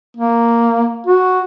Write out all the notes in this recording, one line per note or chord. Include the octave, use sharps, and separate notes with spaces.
A#3
F#4